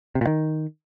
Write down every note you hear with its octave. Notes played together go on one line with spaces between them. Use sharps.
C3
A#2
D#3